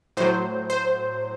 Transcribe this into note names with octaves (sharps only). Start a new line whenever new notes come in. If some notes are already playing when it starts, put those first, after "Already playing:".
A2 F#3 C5
C5